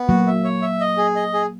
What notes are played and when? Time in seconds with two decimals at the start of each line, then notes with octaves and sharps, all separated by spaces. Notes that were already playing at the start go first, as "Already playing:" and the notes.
Already playing: B3
0.08 F#3 A#3 F#4
0.27 E5
0.44 C#5
0.62 E5
0.80 D#5
0.97 G#4
1.16 D#5
1.34 G#4